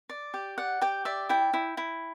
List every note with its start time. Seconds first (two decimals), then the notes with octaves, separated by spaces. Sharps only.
0.09 D5
0.34 G4
0.58 D5 F#5
0.81 G4 G5
1.05 D5 E5
1.29 E4 G5
1.53 E4
1.77 E4